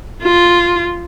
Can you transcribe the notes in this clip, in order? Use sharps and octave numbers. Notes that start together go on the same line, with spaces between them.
F4